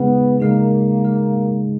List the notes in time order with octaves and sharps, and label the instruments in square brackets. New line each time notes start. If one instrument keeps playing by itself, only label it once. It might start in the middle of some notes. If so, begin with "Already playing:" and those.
Already playing: [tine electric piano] C#3 G#3 D#4 G#4 [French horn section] B3
[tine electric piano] C#3 G#3 D#4 G#4 [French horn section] A#3
[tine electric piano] C#3 G#3 D#4 G#4